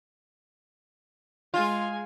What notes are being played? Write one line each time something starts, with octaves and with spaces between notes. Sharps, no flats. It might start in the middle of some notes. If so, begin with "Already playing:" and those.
G#3 F4 G#5